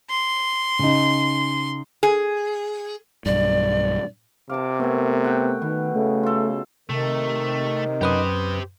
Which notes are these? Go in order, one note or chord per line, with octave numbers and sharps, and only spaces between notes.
C6
C#3 D#4
G#4
B1 G2 D5
C3 F5 A5 D6
A3 B3 A#4 G#5
F#5 G5
B2 D#3
C#3 A3
F4 A4
C3 D#3 A3
F#2 G4 B4 C5 D#6